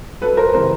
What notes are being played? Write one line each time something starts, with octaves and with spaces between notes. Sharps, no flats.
F#2 A4 B4
A#4 C5
C#3 E3 G3 A#4 C5